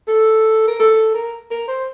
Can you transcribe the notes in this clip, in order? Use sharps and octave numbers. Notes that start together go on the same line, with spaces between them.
A4
A#4
A4
A#4
A#4
C5